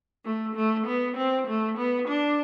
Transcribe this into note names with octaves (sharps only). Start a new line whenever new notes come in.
A3
A3
B3
C4
A3
B3
D4